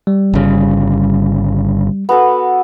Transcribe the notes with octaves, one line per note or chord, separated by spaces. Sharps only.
G3
G1 C#3
B3 F#4 A4